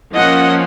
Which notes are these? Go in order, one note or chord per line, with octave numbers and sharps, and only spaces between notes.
F3 A#3 C#4 D#5 F#5